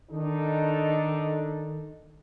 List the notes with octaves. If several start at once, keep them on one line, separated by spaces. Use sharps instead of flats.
D#3 D4 D#4 A4